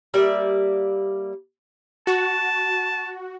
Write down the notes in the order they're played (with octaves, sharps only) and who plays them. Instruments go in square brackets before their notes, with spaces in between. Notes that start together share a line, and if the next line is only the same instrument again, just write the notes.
[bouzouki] G3 A#3 D5 E5
[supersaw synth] F#4 [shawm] A5